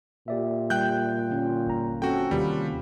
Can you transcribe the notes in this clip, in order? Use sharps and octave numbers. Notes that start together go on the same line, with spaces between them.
A#2 G4 D5 E5
G3 G5 F#6 G6
D3 C#4 F4
G1 A#5
C4 C#4 F#4 A4 G5
D#2 C3 G3 F4 G4 B4